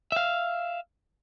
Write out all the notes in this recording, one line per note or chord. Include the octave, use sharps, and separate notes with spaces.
E5 F5